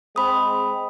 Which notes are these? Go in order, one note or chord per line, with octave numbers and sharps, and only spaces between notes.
G#3 C4 B5 D#6